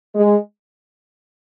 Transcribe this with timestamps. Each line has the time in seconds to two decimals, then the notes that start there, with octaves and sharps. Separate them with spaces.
0.14 G#3